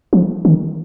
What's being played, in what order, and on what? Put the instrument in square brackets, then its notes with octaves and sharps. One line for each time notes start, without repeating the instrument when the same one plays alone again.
[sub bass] F3
D#3